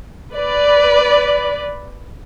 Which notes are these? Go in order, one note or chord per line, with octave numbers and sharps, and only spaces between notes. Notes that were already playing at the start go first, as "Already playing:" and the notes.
B4 D5